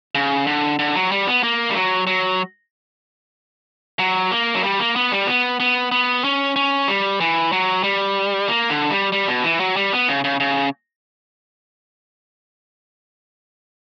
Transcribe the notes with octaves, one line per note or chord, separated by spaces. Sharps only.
C#3
D3
D3
F#3
G3
B3
A#3
G3
F#3
F#3
F#3
A#3
F#3
G3
A#3
B3
G3
B3
B3
B3
C#4
C#4
G3
E3
F#3
G3
A#3
D3
G3
G3
B2
E3
F#3
G3
B3
C#3
C#3
C#3